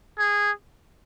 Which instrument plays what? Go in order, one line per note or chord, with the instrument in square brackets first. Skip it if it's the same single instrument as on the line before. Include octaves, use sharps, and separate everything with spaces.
[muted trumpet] G#4